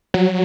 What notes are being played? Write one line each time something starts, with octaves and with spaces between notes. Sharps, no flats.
F#3